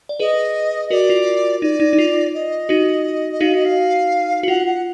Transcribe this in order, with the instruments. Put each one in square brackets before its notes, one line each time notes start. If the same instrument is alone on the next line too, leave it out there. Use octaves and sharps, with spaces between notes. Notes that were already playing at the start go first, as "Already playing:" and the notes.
[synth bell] D5
[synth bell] G#4 B4 [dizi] D#5
[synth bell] F#4 A#4 [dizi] D5
[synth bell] F4
[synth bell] D#4 [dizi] D5
[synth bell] D#4
D#4
F4
[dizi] D#5
[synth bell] D#4 F#4
[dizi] D#5
[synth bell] D#4 F#4 [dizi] F5
[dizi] D#5
F5
[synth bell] F#4
[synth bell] F4 [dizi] F#5
[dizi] F#5